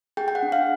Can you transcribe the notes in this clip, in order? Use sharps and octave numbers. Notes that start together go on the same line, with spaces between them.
G#4 G5
G5
F#5
D4
F5